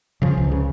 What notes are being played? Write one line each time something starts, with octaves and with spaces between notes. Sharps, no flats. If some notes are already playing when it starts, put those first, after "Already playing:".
C#3 F3
C#2
C#3